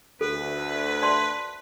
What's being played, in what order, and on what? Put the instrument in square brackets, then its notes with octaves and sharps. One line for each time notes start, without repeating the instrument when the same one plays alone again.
[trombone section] D2 [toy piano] A4 [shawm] B4
[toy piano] D5 A5 C6